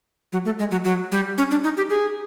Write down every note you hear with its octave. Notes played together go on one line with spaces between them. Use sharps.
F#3
A3
G#3
F#3
F#3
G3
C#4
D4
D#4
G4
G#4